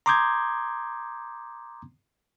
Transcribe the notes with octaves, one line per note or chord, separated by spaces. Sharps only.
A#5 C6 D6 D#6 G6 G#6